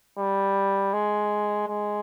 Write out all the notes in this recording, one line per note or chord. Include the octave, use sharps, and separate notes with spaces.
G3
G#3
G#3